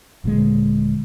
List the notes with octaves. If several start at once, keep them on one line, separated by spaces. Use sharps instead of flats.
D#1 A#2 D3 G#3